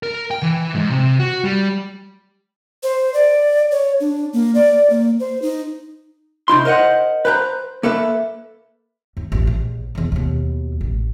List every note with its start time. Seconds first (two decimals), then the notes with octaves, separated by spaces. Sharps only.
0.03 A#4
0.31 G5
0.43 E3
0.75 G#2
0.90 C3
1.19 F#4
1.44 G3
2.83 C5
3.14 D5
3.71 C#5
4.00 D4
4.33 A#3
4.55 D5
4.90 A#3
5.20 C5
5.42 D#4
6.48 C3 D#4 E4 C6
6.65 A#4 C5 D#5 F5 F#5
7.25 B4 C5 G5 A#5
7.83 A#3 A4 B4 E5
9.17 D#2
9.32 A1 F4
9.47 A#1
9.95 B1 E2
10.12 D#2 B2
10.81 A1